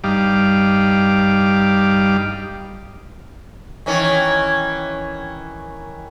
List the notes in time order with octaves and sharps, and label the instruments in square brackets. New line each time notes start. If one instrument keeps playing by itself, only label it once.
[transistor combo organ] G2 G3 D#4 F5 D6
[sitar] D#3 E3 C#4